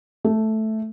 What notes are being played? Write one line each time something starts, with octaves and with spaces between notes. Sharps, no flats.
A3